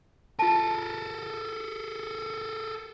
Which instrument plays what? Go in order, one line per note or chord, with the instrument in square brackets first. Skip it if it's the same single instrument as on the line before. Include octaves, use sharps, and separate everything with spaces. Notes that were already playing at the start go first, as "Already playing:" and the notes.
[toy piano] F4 A5 [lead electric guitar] A4 A#4